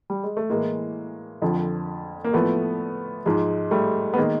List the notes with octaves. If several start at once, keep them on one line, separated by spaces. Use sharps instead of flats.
G3
G#3
A3
A2 E3 G#3 A#3
F2 D3 F3
A#3
A2 F3 A3 B3
G#2 F3 G#3
G3 A3
B3
D#3 G#3 A#3